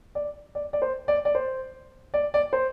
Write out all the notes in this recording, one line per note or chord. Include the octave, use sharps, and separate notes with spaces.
D5
D5
D5
C5
D5
D5
C5
D5
D5
C5